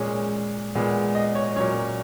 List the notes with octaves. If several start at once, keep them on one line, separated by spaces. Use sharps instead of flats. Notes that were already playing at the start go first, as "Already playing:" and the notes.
Already playing: A#2 G#3 C#4
A#2 G#3 B3
D#5
C#5
A#2 F#3 C#4 C#5